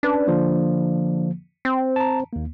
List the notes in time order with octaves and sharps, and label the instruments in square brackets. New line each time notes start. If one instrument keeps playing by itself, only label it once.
[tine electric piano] C#4 B4 [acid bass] D4
[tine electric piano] D3 F3 A#3
[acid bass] C4
[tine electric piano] A5 A#5
D#2 A#3